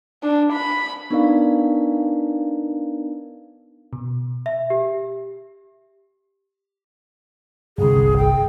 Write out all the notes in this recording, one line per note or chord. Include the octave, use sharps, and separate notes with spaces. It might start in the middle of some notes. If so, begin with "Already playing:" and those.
D4
B5
B3 D4 D#4 A#4 D5 F5
B2
E5
G4
G1 C2 G#4
G5